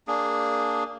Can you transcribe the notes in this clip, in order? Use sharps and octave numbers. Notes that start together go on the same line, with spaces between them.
A#3 D4 G#4